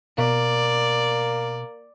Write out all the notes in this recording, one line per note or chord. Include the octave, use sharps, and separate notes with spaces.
B2 A#3 D5